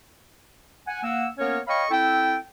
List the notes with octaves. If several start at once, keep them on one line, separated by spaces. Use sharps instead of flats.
F#5 G#5
A#3 F#5 E6
A#3 B3 C#4 A#4 C#5
C#5 D#5 F5 G5 B5 C#6
C4 E4 A4 G5